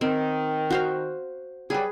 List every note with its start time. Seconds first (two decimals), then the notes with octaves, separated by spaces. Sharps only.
0.01 D#3 C4
0.70 F#4 C5 F5
1.70 F#3 G3 G#4 B4